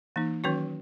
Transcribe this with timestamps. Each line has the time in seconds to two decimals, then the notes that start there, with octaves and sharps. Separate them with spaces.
0.16 E3 A#3 D#4
0.44 D#3 F#3 C#4 F#4 C#5